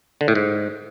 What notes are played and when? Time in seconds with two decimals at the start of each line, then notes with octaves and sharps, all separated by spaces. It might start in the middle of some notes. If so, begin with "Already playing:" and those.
0.21 D3
0.28 A2
0.35 G#2